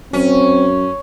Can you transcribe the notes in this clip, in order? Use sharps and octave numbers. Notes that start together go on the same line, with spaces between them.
F#2 C4 C#4